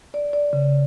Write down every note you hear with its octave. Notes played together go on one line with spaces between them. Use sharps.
D5
D5
C#3